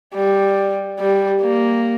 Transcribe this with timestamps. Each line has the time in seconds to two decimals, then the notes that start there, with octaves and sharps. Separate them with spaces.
0.15 G3
0.99 G3
1.42 A#3